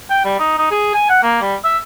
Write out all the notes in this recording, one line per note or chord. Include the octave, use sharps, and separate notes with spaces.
G5
G3
D#4
D#4
G#4
G#5
F#5
A#3
G3
E5